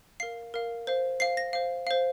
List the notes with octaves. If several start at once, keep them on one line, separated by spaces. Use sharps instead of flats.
A#4 F5 C7
A#4 F5
C5 F5
C5 F5 C7
A#6
C5 F5
C5 F5